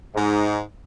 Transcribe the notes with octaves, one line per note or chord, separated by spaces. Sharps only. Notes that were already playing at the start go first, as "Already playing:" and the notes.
G#2